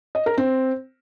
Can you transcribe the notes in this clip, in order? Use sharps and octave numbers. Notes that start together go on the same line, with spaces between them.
D#5
A#4
C4